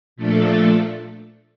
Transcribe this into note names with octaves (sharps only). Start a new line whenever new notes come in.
A#2 F3 A3 D4 A4